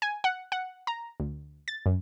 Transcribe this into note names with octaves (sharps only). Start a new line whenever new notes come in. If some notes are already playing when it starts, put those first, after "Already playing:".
G#5
F#5
F#5
A#5
D2
A6
F#2